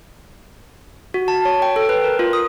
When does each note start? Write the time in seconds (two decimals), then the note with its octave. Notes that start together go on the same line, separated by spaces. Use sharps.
1.14 F#4
1.28 A5
1.45 C#5
1.62 G5
1.76 A4
1.89 B4
2.04 A#4
2.19 F4
2.33 D#6